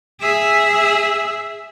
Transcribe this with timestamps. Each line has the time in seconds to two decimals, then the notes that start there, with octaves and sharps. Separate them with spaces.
0.21 G#4 E5